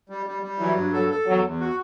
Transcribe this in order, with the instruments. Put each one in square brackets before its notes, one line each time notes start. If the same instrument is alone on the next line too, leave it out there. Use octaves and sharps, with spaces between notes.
[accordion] G3
G3
G3
[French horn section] E3 [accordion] F#3
[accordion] G2
[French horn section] F#3 [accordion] A4
[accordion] A4
[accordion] E2 [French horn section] F#3
[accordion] E2
F#4